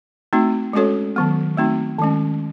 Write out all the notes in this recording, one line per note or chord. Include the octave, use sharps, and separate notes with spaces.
A3 C4 D#4 F#4
G#3 C#4 F#4 A4 C#5
D#3 F#3 B3
A3 C4 D#4 F#4
D#3 G#3 C#4